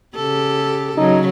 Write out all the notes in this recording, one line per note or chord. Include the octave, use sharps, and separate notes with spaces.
C#3 G4 A4
C#3 F#3 D#4